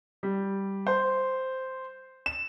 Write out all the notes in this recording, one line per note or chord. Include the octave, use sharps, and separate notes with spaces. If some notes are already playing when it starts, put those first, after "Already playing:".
G3
C5
E7